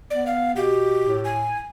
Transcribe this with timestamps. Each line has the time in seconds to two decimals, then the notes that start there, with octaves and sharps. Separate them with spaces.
0.10 B3 D5
0.27 F5
0.56 B2 G4
1.07 A2
1.25 G#5